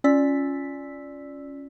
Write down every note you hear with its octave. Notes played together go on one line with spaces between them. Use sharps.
C#4 F4 D5 E6 B6